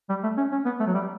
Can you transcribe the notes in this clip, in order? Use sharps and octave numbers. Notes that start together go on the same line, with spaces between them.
G3
A3
C#4
C#4
B3
A3
F#3
G3